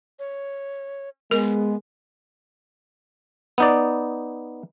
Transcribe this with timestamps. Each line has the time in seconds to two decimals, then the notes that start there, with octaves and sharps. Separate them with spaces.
0.19 C#5
1.31 G#3 B3 A#4
3.58 B3 D#4 D5